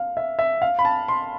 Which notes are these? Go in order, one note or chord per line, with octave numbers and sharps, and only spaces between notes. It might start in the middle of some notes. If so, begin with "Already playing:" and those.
Already playing: F5
E5
E5
F5
B5
A5
C6